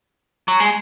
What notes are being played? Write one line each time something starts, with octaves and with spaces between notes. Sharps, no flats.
F#3
G#3